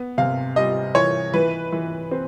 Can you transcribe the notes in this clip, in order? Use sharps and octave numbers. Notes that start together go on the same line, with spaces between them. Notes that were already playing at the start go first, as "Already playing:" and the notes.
Already playing: B3
C3 F5
G3 D#5
E3 C#5
E3 B4
E3
C4